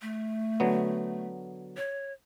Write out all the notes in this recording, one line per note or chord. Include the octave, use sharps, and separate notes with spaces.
A3
D3 F#3 B3
C#5